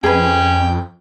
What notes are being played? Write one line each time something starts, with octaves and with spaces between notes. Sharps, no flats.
F2 C#4 G#4 B4 G5